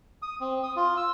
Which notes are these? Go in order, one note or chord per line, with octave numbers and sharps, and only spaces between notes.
D#6
C4
D#6
F4
E6